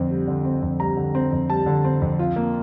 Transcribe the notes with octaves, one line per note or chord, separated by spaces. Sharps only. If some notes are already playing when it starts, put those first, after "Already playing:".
Already playing: F2 D3 C4
G3
D3
C4
F2
G3 A#5
D3
C4
F2
G3 A5
D3
C4
F2
F4
A#3